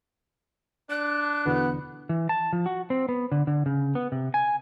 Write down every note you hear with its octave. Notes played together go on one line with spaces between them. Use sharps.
D4 F#6
E2 B2 D3 B3
E3
A5
F3
F#4
C4
B3
D3
D3
C#3
B3
C3
G#5